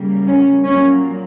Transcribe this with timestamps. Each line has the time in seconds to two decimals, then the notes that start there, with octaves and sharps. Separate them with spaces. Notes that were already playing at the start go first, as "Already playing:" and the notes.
Already playing: C#3 G3 A#3
0.27 C#4
0.65 A#2 F#3 A#3 C#4